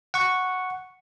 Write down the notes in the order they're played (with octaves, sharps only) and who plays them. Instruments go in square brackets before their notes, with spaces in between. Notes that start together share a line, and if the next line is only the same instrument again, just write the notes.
[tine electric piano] F#5 C#6